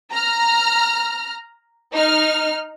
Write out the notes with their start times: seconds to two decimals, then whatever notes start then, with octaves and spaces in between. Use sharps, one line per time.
0.12 A#5 F6
1.94 D#4 F6